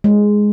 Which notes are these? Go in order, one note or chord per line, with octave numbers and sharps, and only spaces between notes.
G#3